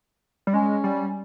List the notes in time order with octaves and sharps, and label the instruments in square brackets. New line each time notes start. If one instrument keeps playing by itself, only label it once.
[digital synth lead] G3
[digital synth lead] G#3 [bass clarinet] C#4
[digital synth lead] G3